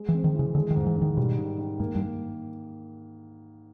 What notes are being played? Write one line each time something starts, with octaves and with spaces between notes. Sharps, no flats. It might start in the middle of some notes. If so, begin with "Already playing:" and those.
Already playing: G#3
E3
C4
D#3
C#3 E3
D3 G#3
D#3
G#2
E3
G#2
D#3
B2 G3
D#3
D#3
G#2 A#3
G2
A#3